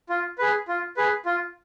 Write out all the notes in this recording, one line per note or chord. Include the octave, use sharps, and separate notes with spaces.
F4
G#4 B4
F4
G#4 B4
F4